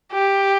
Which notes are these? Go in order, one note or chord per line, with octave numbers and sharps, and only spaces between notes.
G4